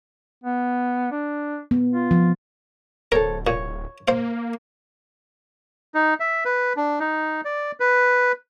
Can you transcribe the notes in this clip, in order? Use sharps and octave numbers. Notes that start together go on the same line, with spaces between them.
B3
D4
B3
F4
F3
D1 A4 A#4 C5 C#5
A#2 C#5
A#3 C5 F5
D#4
E5
B4
D4
D#4
D5
B4